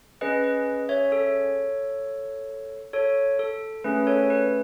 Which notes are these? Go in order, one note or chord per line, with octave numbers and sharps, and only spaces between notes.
C#4 G#4 B4 D#5
B4 D#5
C#5 E5
A4 C#5
A4 C#5
A4
A3 C#4 G#4 B4
A4 C#5
B4